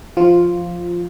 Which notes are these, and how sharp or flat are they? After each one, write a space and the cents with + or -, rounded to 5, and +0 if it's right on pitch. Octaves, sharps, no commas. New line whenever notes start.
F3 +0 F4 +0